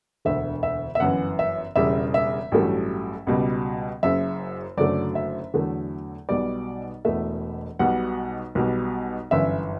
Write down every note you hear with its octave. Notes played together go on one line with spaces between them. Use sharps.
E1 D2 D3 E5
E5
E5
G1 F#2 E3 F#5
E5
E1 E2 C#3 G3 E5
E5
A1 G2 F#3 A3
C#2 B2 G3
F#1 F#2 C#3 E5
F#1 F#2 D3 F#3 A3 D5
E5
E2 D3 F#3 A3
B1 B2 G3 D5
E1 E2 B2 A3 E5
B1 B2 G3 F#5
B1 B2 G3
G1 F#2 E3 E5